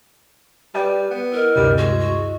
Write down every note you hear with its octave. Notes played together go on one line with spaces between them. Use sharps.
G3 B4 D5 G5
B3
E4 A#4 D#5
D2 G2 C3 G3
G#3 F#4
F#4